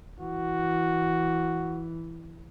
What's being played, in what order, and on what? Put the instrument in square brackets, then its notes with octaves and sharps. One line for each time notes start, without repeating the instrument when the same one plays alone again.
[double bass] E3 [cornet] F#4